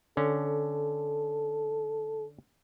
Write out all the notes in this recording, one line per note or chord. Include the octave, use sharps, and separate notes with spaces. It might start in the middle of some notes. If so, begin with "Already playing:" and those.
D3 C#4 A4